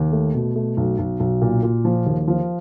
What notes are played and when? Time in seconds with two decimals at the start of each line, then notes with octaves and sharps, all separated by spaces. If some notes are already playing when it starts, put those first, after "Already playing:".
Already playing: D#2
0.12 A3
0.34 B2
0.56 A3
0.77 B1
0.99 B1
1.20 B1
1.42 A#2
1.63 A#2
1.85 F3
2.06 D#2
2.28 F3